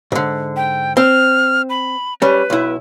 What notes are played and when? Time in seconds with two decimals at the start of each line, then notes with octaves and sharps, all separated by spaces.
0.12 G#2 D3
0.56 G5
0.97 C4 F6
1.70 B5
2.22 G3 C#4 B4
2.50 B1 E4